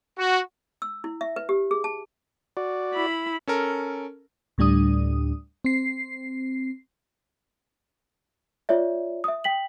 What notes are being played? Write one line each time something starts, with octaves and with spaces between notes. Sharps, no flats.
F#4
E6
E4
E5
B4
G4
G#4
A5
F#4 D5
E4 B5
C#4 A4 A#4
D2 A2 G3 D4 D#6
C4 C7
F4 C#5 D5 E5
E5 D#6
G5 B6 F#7